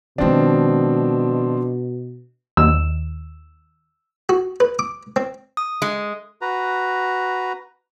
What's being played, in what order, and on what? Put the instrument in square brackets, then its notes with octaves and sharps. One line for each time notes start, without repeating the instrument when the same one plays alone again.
[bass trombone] B2 [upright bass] D#3 G#3 [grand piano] F3 C4 D4
[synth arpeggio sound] D#2 [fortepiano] E6
[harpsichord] F#4
B4
D6
C4
[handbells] D#6
[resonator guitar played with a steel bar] G#3
[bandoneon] F#4 B4 A#5